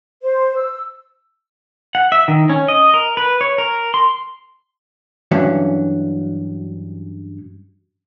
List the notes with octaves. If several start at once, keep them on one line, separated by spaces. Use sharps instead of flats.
C5
E6
F#5
E5
D#3
C#4
D#5
A#4
B4
C#5
A#4
C6
G2 E3 F#3 C#4